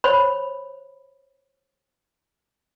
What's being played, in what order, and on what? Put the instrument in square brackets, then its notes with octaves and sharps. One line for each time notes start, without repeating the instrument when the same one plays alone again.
[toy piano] C5 C#5 B5